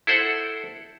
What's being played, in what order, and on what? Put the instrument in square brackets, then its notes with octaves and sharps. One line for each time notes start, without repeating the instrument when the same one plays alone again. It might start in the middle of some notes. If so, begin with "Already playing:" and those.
[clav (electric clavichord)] E4 A4 C5 F#5